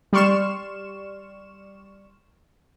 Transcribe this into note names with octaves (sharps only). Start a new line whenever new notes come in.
G3 D5 C6 C#6 F6 E7